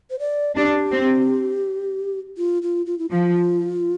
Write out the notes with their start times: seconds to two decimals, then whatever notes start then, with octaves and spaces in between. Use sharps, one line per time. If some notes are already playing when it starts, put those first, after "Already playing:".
0.10 C5
0.19 D5
0.56 D4 G4
0.92 C4
2.37 F4
2.62 F4
2.86 F4
2.99 E4
3.10 F3 F4